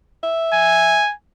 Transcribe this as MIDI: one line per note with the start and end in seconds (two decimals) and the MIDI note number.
0.23 1.02 76
0.54 1.13 80